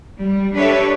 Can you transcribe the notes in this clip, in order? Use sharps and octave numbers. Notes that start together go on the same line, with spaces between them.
G3
D4 G4 A4 B4 C#5 E5